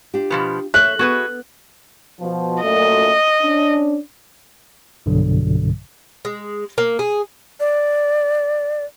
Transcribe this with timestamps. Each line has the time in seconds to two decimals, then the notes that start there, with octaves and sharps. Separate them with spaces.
0.14 D4 F4 G4
0.30 B2 F3 B3
0.74 A4 C#5 E5 F#6
0.99 B3 F#4 G#4 B4
2.21 B2 F3
2.63 F#2 A#2 A3 D#5
3.43 C#4 D4
5.06 B1 G2 B2 D3 F#3
6.25 G#3
6.78 A#3
6.99 G#4
7.60 D5